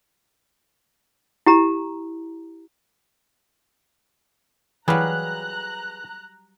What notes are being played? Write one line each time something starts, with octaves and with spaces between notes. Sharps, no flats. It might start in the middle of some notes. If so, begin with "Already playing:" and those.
E4 G4 A#5
E3 F#3 G3 G#4 B4 F5 A#5 F#6